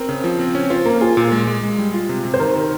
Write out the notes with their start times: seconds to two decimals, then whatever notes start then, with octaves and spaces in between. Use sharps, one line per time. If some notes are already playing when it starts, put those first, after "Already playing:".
Already playing: C4 A#4
0.09 C#3
0.24 F3
0.39 C4
0.55 C#4
0.70 F4 C5
0.85 A#3 A#4
1.01 F4 G#4
1.17 A#2
1.32 G#3
1.47 G#3
1.63 G#3
1.78 G3
1.94 F4
2.09 C3
2.25 C3
2.34 C5
2.40 D#3 A#4
2.55 D#3